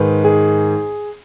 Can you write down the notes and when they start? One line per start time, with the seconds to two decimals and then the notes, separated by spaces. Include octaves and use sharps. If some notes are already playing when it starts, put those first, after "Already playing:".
Already playing: G#2 D#3 B4
0.24 G#4